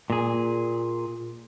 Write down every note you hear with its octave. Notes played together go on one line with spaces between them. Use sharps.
A#2 G#4